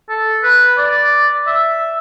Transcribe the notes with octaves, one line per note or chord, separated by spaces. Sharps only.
A4
B4
D5
E5